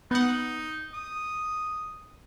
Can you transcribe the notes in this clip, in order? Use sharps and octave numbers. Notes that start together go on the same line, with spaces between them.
B3 D#4 F#5
D#6